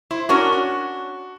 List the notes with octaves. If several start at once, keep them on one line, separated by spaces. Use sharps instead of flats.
E4 C5
C#4 D4 F#4 A#4 C#5
F#4